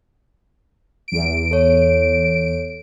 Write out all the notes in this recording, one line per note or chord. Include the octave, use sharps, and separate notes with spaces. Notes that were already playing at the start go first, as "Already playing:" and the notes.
E2 D7
A4 C#5